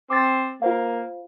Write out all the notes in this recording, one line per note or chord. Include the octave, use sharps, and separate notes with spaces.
C4 D6 A6
A#3 F4 C5 F5